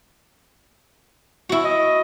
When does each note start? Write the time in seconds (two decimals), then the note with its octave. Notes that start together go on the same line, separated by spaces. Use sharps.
1.49 E4 F#4
1.64 D#5